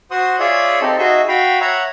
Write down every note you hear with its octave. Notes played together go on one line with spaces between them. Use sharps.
F#4 C5 F#5 C6 D#6
F4 G#4 C#5 D5 E5
C4 D#4 G4 A4
D#4 F#4 G#4 D#5 E5
F#4 F5 G5 B5
C#5 E5 F#5 A#5